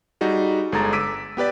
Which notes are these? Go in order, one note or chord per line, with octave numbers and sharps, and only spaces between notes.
G3 D#4 F#4 G#4
G1 G#3 A4 A#5 A6
D6 E6 B6 D7 D#7
B3 G4 B4 D5